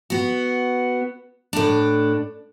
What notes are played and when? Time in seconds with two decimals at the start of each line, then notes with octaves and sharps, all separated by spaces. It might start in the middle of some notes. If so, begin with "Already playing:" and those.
0.10 B3 F#4
1.53 A2 D4